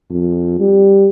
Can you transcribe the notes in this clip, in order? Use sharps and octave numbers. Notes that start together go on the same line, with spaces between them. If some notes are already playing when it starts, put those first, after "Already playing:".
F2
G3